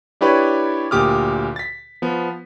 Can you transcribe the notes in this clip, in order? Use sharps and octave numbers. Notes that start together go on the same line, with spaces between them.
D4 E4 G4 B4 C#5 D5
D2 A#2 G4 D6 D#6 F6
A6 B6
F3 B3